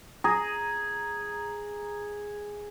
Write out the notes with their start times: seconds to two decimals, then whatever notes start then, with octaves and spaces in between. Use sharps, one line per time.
0.24 G#4 A#5